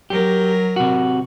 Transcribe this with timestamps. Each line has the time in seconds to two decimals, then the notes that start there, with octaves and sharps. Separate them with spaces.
0.10 F#3 G4 A#4
0.76 C3 F#4